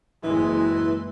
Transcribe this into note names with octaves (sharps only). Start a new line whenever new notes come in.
F#1 E3 G#3